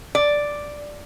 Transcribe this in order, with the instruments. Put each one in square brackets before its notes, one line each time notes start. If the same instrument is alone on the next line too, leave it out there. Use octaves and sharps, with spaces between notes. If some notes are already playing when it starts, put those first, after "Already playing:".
[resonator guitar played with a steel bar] D5